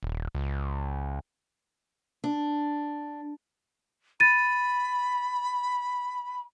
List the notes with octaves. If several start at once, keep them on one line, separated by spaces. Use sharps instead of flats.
D#1
C#2
D4
B5 A6 D#7